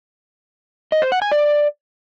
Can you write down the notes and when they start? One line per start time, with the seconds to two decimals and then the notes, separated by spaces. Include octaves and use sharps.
0.92 D#5
1.02 C5
1.12 F#5
1.22 G#5
1.32 D5